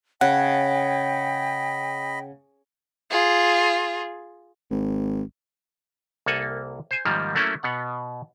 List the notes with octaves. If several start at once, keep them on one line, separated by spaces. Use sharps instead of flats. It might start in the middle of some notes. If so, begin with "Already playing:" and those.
C#3 D#5 F#5 G5 B5
F4 G#4
G#1
C2 A#3 A4 F#5 G#5
C5 G#5
G#2 D#3 F3 G3 A#3
F#3 A3 A#3 C#4 E4
B2 B3 F#5